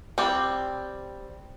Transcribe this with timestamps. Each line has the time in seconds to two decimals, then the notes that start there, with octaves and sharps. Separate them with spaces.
0.18 G3 C4